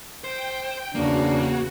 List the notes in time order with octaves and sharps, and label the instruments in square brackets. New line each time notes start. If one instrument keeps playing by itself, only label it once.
[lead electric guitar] C5 [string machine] G5
[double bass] E2 C#3 [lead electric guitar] A#3 [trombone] D4 [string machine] F#4